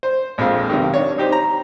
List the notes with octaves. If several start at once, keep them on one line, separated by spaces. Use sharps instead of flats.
C5
A#1 F2 G#3 F5
B1 C3 D#3
D4 C#5
D#4 G4 C5
A#5